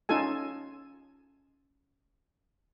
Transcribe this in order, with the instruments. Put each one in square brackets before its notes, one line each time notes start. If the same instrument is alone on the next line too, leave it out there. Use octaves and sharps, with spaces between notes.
[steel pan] C#4 D#4 F4 A4 G#5